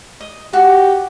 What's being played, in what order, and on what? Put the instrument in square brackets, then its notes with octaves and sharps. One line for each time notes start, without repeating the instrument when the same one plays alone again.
[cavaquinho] D#5
[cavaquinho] F#4 [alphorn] G4